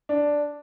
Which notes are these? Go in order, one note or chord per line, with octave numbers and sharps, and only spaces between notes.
D4